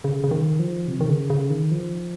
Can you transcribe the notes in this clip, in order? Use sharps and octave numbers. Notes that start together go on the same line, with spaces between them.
C#3
C#3
D#3
F3
C3
D#3
C#3
C#3
D#3
F3